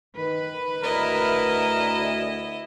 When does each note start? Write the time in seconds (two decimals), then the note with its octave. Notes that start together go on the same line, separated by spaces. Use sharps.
0.17 D#3 B4
0.83 D2 E4 A#4 D#5